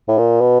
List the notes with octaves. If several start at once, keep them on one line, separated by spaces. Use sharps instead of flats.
A2
A#2
B2